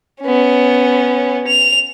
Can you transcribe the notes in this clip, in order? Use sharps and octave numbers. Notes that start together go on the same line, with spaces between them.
B3 C#4
F7